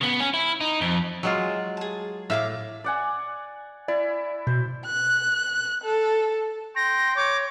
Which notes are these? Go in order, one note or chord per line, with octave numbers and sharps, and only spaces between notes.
C#3 B3
C#4
E4
D#4
F2
F#3 G#3 F4 F#4 G#4
G#4 A5
A2 E5 F5 D6
D5 F#5 G#5
E4 D5
B2 C5
F#6
A4
G5 C6 A#6
C#5 D6